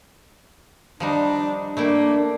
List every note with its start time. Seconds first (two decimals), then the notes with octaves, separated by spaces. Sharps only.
1.00 F3 G3 D4 D#4
1.77 A3 A#3 D4 E4 G5